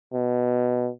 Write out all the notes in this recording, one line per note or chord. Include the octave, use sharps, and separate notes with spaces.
B2